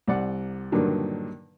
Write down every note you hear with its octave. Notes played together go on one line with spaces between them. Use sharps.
C2 D5 F#5
G2 A#2 D3 D#3 F#3